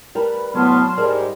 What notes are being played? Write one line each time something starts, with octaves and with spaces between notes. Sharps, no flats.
G3 A#4 B4 A5 B5
A2 C3 F#3 B3 A5 C6 F6
G#2 G3 G#4 A#4 D5